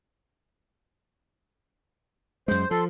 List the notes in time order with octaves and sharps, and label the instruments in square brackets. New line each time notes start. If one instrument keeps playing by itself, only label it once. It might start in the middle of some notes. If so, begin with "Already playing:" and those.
[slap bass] F#2 G#3 [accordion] C5
[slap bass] F3 [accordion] A4 C6